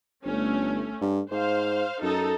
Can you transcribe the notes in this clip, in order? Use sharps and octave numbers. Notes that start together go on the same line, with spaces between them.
G1 A3 C#4
G2
G#2 C5 F5
F#2 D#4 A4